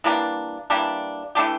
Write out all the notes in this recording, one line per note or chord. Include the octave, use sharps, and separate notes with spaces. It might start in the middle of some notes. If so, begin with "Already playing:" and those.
E3 G3 A#3 D4
E3 G3 A#3 D4
E3 A3 D4 G4